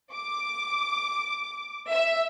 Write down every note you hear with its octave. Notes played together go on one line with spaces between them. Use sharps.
D6
E5